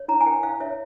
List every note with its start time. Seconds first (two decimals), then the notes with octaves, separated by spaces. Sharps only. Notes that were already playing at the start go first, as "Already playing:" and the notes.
Already playing: C#5
0.08 E4 A#5
0.21 G#5
0.26 A#4 G5
0.43 E4 F5
0.60 C#5 E5